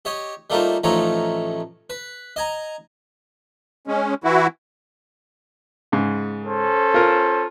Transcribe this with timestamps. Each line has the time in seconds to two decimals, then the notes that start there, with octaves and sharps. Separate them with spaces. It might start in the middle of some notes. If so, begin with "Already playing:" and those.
0.05 G4 C#5 D#5
0.50 G3 A3 A#3 D#4 F4 C5
0.83 A1 F3 A3 D#4 C#5 A#5
1.90 B4
2.36 D#5 G#5 A#5
3.87 G#3 C#4
4.24 E3 E4 F#4
5.92 G#2 C#3
6.44 C#4 A4 C5
6.94 F4 A#4